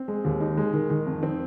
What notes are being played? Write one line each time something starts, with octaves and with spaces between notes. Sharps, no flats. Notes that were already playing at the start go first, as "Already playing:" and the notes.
Already playing: C4
G#3
D#2
D#4
G#3
D#3
D#3
F2
C4